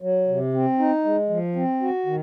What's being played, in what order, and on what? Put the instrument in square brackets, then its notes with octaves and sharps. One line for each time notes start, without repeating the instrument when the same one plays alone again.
[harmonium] F#3
C3
C4
D#4
G#3
F3
C4
F#4
D#3